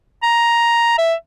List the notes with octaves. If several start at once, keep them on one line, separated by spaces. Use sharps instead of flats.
A#5
E5